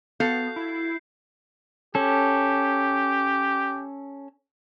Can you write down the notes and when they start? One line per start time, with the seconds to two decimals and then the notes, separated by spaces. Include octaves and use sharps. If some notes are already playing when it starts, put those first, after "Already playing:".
0.20 B3 F#4 A4 F5 G6 C7
0.56 E4
1.95 C#4 G4 A4